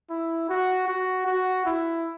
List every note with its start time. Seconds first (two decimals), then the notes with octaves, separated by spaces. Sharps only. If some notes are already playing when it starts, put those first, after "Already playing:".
0.10 E4
0.49 F#4
0.88 F#4
1.27 F#4
1.66 E4